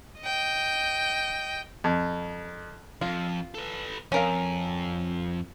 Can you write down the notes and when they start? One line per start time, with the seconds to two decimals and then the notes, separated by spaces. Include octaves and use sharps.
0.21 D#5 G5
1.84 F2
3.01 F2 F4
3.54 A4 B4
4.12 F2 C#4 A#4 F5